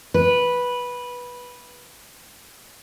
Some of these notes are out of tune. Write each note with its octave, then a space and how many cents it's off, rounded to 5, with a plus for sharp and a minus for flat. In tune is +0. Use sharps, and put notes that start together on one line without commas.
B4 -10